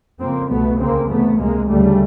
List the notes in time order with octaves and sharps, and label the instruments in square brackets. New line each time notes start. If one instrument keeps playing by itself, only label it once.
[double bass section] F2 C#3 A#3 C4
C2 B2 A3 B3
D2 C#3 A#3 C4
E2 C3 A3 B3
C#2 C3 G#3 A#3
D2 C#3 G3 A3